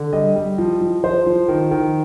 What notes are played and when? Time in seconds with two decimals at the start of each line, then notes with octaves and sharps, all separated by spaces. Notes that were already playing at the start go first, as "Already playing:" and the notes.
Already playing: D3
0.13 G3 D#5
0.36 G3
0.58 F3
0.81 F3
1.04 F3 C5
1.26 F3
1.48 D#3
1.71 D#3